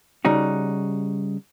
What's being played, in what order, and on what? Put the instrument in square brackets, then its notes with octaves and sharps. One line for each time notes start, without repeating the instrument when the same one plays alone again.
[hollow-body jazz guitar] C#3 G3 D#4 F#4